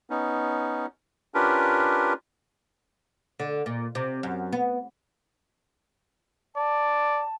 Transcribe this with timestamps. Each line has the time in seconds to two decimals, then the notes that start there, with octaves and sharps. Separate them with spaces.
0.10 B3 C#4 D#4
1.34 C#4 D4 F4 G4 A#4 B4
3.39 D3
3.66 A#2
3.95 C3
4.23 F#2
4.52 B3
6.56 D5 A5